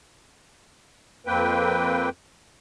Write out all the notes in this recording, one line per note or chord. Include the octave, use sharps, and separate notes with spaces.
F2 A#3 C4 B4 G5